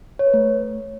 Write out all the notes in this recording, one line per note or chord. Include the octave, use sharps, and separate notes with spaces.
C#5
B4
A3